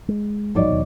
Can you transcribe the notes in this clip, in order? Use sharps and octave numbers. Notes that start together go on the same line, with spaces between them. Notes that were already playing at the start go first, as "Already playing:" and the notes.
G#3
A1 G#2 F#3 D#4 D5
D#2 B2